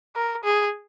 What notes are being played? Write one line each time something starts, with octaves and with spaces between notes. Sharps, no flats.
A#4
G#4